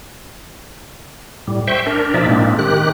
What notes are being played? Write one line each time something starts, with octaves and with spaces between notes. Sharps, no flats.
A2 G3
C5 E5 G5 C#6
D4 A#4
B2 F3 D#4 D5 E5
A2 G#3 A#3 C4 D4
D#3 G4 F#6